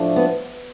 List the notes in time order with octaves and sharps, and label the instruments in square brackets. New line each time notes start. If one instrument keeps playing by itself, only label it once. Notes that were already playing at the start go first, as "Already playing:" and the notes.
Already playing: [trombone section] A2 F3 A3 D4
[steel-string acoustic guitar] B3